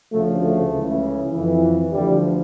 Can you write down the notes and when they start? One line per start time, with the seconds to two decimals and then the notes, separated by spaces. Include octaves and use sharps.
0.12 D2 C#3 F3 A3
0.42 A3
0.72 C#2 C#3 E3
1.32 F2 E3
1.92 D2 D3 F3 G3